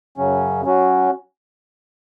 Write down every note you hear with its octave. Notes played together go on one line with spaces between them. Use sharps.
F#2 C#3 F#3 C#4
F#3 C#4 F#4